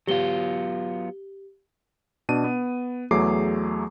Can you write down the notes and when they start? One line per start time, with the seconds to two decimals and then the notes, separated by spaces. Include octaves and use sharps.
0.07 F#3 B3 F4 G4 G7
2.29 B2 D4 D#7
2.44 B3
3.11 E2 F#3 A3 G#4 D6 C7